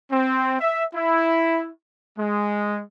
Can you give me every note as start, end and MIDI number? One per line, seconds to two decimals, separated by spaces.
0.11 0.55 60
0.60 0.84 76
0.94 1.69 64
2.17 2.82 56